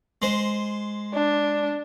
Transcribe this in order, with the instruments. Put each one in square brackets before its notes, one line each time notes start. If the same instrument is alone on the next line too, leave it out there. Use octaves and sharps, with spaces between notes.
[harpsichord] G#3 C5
[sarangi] D4